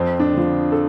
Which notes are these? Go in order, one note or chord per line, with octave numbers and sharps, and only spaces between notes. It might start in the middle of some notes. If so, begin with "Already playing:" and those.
Already playing: F2 C4
D4
D3 F3
A4